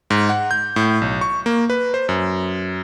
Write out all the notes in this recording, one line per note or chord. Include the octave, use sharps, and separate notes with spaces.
G#2
F#5
G6
A2
B1
C#6
A#3
B4
C5
F#2